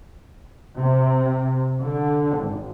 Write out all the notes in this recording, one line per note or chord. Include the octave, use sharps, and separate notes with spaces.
C3
D3
G#1